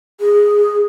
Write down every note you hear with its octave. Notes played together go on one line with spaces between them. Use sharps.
G#4